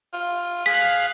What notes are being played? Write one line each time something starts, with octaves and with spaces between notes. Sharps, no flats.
F4
G#4 F5 F#6 B6